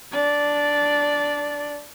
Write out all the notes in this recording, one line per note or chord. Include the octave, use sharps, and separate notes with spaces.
D4 D5